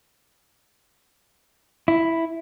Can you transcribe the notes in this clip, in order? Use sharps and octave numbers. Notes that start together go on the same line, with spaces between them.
E4